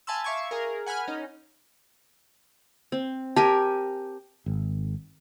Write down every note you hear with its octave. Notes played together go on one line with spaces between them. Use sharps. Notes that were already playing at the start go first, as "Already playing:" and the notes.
F5 G#5 A5 B5 C6 E6
E5 F5 C#6 D6 G#6
G#4 A#4
F#5 G#5 B5 F6
C#4 D#4
C4
G4 A#4 G#5 A5
G#1